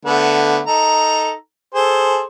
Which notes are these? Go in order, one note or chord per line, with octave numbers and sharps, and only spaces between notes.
D3 A3 B3
D#4 A4 A#5
G#4 A4 C5